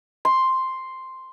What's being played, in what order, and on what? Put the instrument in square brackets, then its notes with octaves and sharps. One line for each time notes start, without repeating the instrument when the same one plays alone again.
[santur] C6